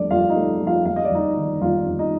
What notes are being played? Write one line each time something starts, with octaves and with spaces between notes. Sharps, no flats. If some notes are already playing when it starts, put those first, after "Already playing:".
Already playing: G1 F2 A3 D4 D5
G1 F4 F5
D#4 D#5
A3
F2
F4 F5
G1 F5
D#5
D5
G1 D#4 D#5
D#3
G1 F4 F5
G1
D#4 D#5